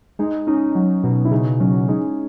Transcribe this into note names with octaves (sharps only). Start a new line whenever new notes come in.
G#3 D#4
C#4 D#4
F#3
B2
E4
C#3 D#4
F#3 C#4
G#3 D#4